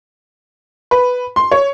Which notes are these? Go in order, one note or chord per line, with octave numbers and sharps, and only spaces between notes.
B4
C6
C#5